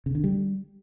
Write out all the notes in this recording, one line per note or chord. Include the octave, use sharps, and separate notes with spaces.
C#3
D3
G3